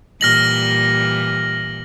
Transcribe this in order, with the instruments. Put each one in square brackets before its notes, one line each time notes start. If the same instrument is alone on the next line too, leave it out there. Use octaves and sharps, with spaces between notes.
[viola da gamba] A#2 E3 G3 [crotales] F6 A#6 F#7